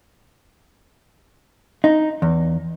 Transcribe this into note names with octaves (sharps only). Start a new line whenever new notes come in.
D#4
E2